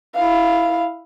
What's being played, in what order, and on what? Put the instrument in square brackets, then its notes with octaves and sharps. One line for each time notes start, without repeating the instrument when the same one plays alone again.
[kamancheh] E4 F5